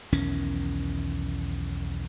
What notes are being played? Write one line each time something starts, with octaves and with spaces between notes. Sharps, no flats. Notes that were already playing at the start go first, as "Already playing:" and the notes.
B1 E2 D#3 C#4